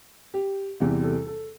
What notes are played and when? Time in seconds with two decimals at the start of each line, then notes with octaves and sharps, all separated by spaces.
0.34 G4
0.80 E2 C3 E3 G3 G4
1.03 A4
1.27 A4